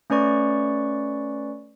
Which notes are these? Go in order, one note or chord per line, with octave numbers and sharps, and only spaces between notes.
A3 C#4 B4 D5 C#6